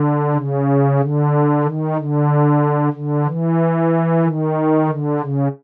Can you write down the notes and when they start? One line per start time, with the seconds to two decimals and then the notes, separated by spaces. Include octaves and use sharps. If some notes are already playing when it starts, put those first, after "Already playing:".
Already playing: D3
0.34 C#3
0.99 D3
1.63 D#3
1.96 D3
2.93 D3
3.26 E3
4.23 D#3
4.87 D3
5.20 C#3